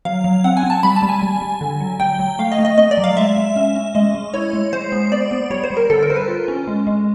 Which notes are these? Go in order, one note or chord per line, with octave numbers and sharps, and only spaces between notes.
F#3 F5
F#3
C4 F#5
G#5
C4
A5
G3 B5
A5
G3
G#5
G3
G3
D3
F#3
F#3 G5
F#3
A3 F5
D#5
A3
D#5
A3 D#5
D5
F#3
F5
G#3 E5
G#3
C#4
C#4
G#3 D#5
G#3
E4 C#5
G#3
G#3 C5
B3
B3 D5
B3
G3 C#5
C5
G3
A#4
D3 A4
A#4
G3 C5
B4
F4
C#4
G#3
G#3